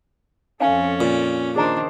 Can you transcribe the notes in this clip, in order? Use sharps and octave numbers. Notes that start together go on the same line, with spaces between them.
F2 C#4 A4 E5 F5 G#5
A#2
D#3 D4 G#4 C5 D5 A#5